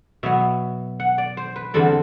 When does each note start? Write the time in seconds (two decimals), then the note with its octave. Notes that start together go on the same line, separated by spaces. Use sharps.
0.23 B2 F#3 B3 E5
1.00 F#5
1.18 D5
1.37 C5
1.56 B4
1.74 E2 D3 G3 C4 A4